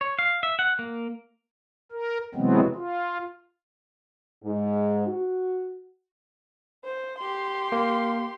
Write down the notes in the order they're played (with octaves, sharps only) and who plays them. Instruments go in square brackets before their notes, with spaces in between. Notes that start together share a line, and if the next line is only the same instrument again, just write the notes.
[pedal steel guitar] C#5
F5
E5
F#5
A#3
[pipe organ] A#4
C3 E3 F#3 G#3 B3 C4
F4
[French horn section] G#2
F#4
[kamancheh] C5
G4 C6
[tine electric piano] A#3